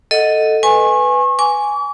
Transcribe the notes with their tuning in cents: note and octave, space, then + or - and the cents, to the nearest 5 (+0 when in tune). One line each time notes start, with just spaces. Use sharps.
A4 +0 D#5 +0 F#5 -10
B4 +10 G#5 +0 C#6 -35
G#5 +0 D6 -40